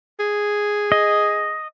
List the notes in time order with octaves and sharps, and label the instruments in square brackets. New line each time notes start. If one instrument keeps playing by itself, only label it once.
[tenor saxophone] G#4
[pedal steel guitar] D#5